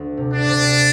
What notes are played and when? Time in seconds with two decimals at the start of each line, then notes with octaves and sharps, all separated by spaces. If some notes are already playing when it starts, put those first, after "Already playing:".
Already playing: D2
0.17 C3
0.33 D4
0.47 C3